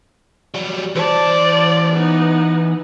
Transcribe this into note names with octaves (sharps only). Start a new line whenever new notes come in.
F#3 G3
E3 C5 D5 A5
B3 D#4